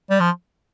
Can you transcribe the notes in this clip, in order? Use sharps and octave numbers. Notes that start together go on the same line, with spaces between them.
G3
F3